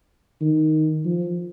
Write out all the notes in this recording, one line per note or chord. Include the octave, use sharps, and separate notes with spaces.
D#3
F3